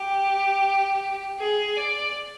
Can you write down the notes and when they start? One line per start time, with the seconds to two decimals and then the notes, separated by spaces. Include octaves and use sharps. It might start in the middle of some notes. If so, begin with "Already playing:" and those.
Already playing: G4
1.39 G#4
1.77 D5